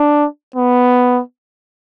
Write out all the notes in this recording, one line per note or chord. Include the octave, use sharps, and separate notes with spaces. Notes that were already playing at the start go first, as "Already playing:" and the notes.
Already playing: D4
B3